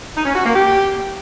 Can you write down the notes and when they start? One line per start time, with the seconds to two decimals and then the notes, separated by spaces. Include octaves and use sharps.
0.15 D#4
0.25 C#4
0.35 F#4
0.45 A#3
0.55 G4